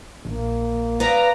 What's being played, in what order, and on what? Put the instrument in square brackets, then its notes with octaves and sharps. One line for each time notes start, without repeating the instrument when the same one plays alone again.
[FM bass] A#1 [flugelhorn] A#3
[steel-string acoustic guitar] B3 B4 D5 [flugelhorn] F5 [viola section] A#5